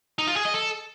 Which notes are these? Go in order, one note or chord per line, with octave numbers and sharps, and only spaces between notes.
D#4
F4
G#4
D#5
A4